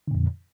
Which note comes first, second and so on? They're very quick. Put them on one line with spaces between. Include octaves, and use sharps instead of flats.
D3 A#2 F2